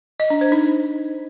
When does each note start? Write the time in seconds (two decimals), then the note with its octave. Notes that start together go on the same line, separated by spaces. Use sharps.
0.20 D#5
0.30 D4
0.41 C5
0.52 D#4